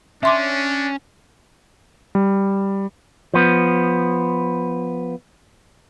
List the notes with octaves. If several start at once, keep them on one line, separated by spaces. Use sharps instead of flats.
C#4 D4 E5 C6 D6
G3
F3 B3